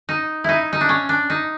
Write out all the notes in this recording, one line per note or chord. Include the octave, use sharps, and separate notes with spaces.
D#4
D#4 E4
D#4
D4
C#4
D4
D#4